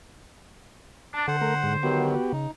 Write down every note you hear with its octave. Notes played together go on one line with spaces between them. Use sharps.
D4 A5
D3 A4 C5 F#5
A3 A#4
G#2
D#3 F#3 B3 F#4 G4
C#3 D#4